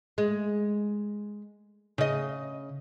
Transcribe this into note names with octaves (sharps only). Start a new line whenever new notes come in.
G#3
C#3 D#5